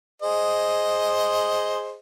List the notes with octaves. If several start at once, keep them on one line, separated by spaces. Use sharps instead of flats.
G#4 C5 D#5